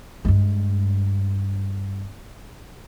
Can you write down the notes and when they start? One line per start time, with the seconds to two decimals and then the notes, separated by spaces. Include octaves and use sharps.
0.25 G2 G#3